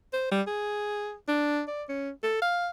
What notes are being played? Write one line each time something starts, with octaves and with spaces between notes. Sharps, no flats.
C5
G3
G#4
D4
D5
C#4
A4
F5